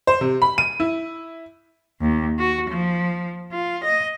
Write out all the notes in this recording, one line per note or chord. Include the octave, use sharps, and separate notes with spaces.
C5
C3
B5
D#7
E4
D#2
F#4
F3
F4
D#5